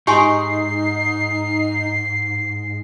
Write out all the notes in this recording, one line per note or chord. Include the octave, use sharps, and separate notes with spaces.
G#2 D#4 G4 G#5 C6 C7